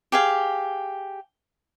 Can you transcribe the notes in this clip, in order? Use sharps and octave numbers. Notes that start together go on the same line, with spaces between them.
G4 G#4 F5